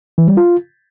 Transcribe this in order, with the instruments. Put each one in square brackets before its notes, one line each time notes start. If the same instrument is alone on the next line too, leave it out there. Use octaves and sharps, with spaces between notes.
[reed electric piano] E3
G3
F4